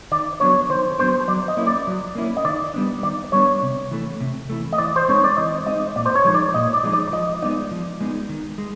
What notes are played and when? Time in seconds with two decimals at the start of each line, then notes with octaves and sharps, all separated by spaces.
0.11 D#3 D5
0.40 F#3 B3 D4 C#5
0.70 D#3 C5
0.98 F#3 B3 D4 C5
1.28 F#3 D5
1.48 D#5
1.57 A#3 C#4 E4
1.67 D5
1.87 F#3
2.15 A#3 C#4 E4
2.37 D#5
2.45 D#3 D5
2.74 G3 B3 D4
3.03 D#3 D5
3.32 G3 B3 D4 C#5
3.62 C3
3.91 E3 A3
4.20 C3
4.49 E3 A3
4.73 D#5
4.78 E3 D5
4.96 C5
5.08 G#3 C4 D#4 C#5
5.24 D5
5.37 E3 D#5
5.66 G#3 C4 D#4 D#5
5.95 A#2 D5
6.06 C5
6.15 C#5
6.25 F3 G#3 B3 D#4
6.34 D5
6.54 A#2 D#5
6.73 D5
6.83 F3 G#3 B3 D#4
6.93 D5
7.12 F3 D#5
7.42 G#3 B3 D#4 D5
7.71 F3
8.00 G#3 B3 D#4
8.29 D#3
8.58 G#3